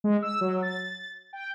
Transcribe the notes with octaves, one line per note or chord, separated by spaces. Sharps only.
G#3
E6
F#3
A6
G5